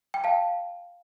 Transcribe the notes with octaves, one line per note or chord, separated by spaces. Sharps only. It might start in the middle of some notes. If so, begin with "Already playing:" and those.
G5
F5 A5